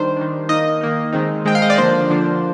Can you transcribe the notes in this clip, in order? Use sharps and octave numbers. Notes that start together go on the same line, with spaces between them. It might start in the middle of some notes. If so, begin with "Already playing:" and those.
Already playing: D#3 G3 D4 C5
D#3 G3 D4
D#3 A#3 D#4 D#5
D#3 A#3 D#4
D#3 G#3 C4 D#4
D#3 G#3 C4 D#4 G5
F5
D#5
D5
D3 F3 A#3 D4 C5
D3 F3 A#3 D4